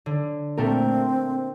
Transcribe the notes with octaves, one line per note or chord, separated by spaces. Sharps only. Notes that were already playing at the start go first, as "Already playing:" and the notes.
D3
A#2 A3 C4 A#4 G5